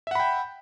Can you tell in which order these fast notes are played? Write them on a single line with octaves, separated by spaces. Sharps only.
E5 F#5 B5 G5